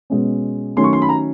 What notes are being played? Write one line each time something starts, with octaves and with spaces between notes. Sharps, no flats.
B2 G#3 C#4
D#3 F#3 A3 C#4 C6
C#6
C6
B5
A#5